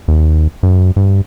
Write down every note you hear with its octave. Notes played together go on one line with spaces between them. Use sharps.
D#2
F#2
G2